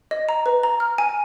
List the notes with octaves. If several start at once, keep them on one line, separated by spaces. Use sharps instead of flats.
D#5
A#5
B4
A#5
F6
G#5